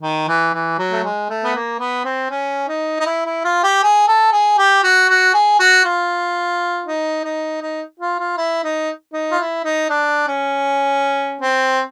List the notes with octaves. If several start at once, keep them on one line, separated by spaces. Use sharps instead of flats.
D#3
E3
E3
F#3
A3
G#3
A3
B3
A#3
B3
C4
C#4
D#4
D#4
E4
E4
F4
G4
G#4
A4
G#4
G4
F#4
F#4
G#4
F#4
F4
D#4
D#4
D#4
F4
F4
E4
D#4
D#4
F4
E4
D#4
D4
C#4
C4